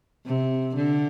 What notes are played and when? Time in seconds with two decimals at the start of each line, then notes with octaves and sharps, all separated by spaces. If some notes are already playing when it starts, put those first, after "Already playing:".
0.26 C3
0.76 D3